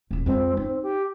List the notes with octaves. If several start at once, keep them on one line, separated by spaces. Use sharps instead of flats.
D#1 E2
F2 G#3 C4
C4 D#4
G4